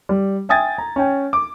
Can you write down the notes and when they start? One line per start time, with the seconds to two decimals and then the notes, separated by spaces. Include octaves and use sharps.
0.09 G3
0.49 E5 G5 G#5 D#6 G#6 A6
0.78 A#5
0.96 C#4 G5 G#5
1.33 D6